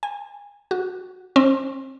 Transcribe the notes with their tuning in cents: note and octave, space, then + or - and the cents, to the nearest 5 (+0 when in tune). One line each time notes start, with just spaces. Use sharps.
G#5 -30
F#4 -10
C4 +35